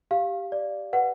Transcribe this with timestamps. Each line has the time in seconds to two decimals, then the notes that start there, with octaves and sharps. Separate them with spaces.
0.11 G4 F5
0.52 D5
0.93 B4 F#5